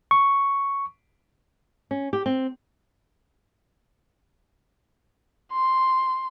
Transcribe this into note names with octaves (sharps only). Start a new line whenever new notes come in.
C#6
C#4
G4
C4
C6